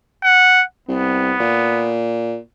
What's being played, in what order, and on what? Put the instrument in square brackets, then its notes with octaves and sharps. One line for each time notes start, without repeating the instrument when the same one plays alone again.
[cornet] F#5
[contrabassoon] C2 [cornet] B3
[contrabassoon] A#2